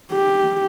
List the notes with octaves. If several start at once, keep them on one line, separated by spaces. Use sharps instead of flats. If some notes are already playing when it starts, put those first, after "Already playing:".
G4